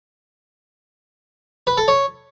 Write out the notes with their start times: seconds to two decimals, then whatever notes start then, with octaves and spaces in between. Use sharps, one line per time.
1.67 B4
1.77 A4
1.88 C#5